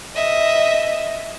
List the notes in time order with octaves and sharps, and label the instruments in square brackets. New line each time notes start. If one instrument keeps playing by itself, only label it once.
[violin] D#5 E5